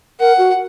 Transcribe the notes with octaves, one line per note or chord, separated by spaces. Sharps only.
A#4 F#5
F#4